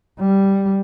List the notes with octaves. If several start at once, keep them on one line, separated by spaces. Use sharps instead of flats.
G3